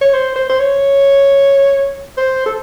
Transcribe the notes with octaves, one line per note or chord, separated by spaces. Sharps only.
C#5
C5
C5
C5
C#5
C5
A4